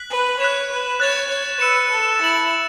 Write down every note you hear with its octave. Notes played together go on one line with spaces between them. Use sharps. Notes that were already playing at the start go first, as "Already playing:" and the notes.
Already playing: F#6 B6 F#7
B4
C#5 F#6 B6 E7
B4
C#5 F#6 A6 E7
C#5
B4 E6 C#7 E7
A4
E4 A6 C#7 F#7